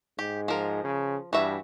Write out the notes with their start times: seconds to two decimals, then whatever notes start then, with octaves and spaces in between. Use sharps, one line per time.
0.19 G#2 G4
0.48 F3 A#4
0.84 C#3
1.33 G2 E3 F#4 E5